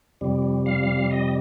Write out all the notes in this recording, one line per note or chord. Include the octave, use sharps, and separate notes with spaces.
F2 C3 G3
F5
D#5